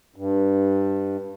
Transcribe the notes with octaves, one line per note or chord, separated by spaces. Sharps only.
G2